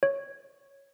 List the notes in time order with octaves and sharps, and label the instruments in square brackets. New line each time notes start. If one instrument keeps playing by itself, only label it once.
[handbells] C#5